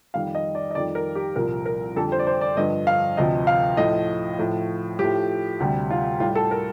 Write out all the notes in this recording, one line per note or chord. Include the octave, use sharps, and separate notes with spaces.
F2 D#3 G3 F5
D#5
D5
D#5
F2 D#3 G3 D5
A#4
G4
C2 A#2 F3 A#4
A#4
F2 D3 G3 A4
C5
D5
C5
D5
G2 D3 F3 D#5
F5
D2 C3 F3 D#5
F5
A2 F3 D#5
A2 F3
A2 F3 G4
D2 C3 G3
F4
A2 G3 F4
A4
A#4